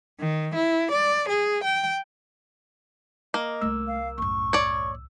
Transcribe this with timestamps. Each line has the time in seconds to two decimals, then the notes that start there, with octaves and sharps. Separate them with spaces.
0.20 D#3
0.55 E4
0.91 D5
1.29 G#4
1.64 G5
3.34 A#3 D#5
3.61 C2 A3 C#4 E6
3.87 F5
4.18 A1 F#2 C#6
4.53 C#5 D5